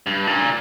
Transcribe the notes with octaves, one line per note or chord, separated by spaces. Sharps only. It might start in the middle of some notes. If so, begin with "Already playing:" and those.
G2
A#2